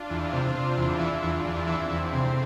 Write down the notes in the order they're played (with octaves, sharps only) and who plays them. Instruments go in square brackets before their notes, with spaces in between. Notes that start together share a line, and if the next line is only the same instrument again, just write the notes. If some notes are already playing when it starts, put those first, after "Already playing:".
Already playing: [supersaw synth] D4 F4
[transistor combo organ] E2
C3
C3
E2
E3
[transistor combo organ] E2 [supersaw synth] D4 F4
[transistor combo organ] E2
[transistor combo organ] E3 [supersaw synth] C4 E4
[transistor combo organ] E2
[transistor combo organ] C3 [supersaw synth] A3 C4